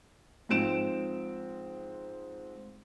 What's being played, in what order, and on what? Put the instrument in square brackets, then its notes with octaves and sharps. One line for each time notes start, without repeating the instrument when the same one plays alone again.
[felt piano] G#2 F3 C4 D7 E7